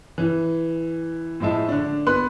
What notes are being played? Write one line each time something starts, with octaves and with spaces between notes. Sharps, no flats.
E3
A2 F3 G#3 E5 A5
D3 D4
B3 B5 C6 F#6